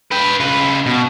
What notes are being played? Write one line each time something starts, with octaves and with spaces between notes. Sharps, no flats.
B4 G5
C#3 B4
B2